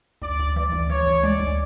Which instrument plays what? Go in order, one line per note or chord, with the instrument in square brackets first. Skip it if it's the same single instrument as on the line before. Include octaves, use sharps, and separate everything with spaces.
[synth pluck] D2 [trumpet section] D5
[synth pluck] D2
[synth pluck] E3 [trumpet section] D5
[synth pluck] D2
[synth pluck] E3 [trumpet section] C#5
[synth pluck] D2
[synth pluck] G#3 [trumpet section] D5
[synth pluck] D2